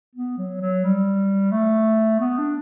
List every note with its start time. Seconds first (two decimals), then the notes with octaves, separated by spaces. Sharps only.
0.15 B3
0.38 F#3
0.61 F#3
0.84 G3
1.51 A3
2.20 B3
2.38 D4